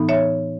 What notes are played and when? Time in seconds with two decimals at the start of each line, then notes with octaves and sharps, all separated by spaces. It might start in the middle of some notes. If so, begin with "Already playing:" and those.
Already playing: A2 E3 B3 D#4
0.09 C#5 E5